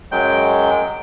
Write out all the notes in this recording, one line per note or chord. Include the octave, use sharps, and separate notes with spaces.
F#2 F#3 G#3 G5 G6